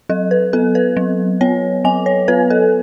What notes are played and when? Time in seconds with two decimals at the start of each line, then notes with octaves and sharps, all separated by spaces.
0.09 F#3 A4
0.31 B4
0.53 B3 A4
0.75 B4
0.97 F#3
1.41 B3 C#5
1.84 F#3 G#5
2.06 C#5
2.28 B3 B4
2.50 A4